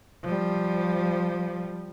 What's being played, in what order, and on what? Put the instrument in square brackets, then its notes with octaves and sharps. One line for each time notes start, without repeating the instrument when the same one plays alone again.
[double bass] F3 G3